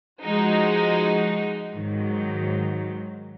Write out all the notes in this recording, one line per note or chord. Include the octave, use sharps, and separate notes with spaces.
F3 G#3 D#4 F#4
G#2 D#3 F#3